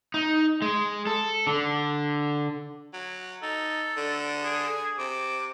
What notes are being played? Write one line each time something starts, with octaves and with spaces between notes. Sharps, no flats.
D#4
G#3
A4
D3
F#3
D#4 A4
D3
G#4
C3 D6